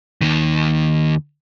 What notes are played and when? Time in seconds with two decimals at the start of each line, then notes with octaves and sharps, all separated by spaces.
0.21 D#2 D#3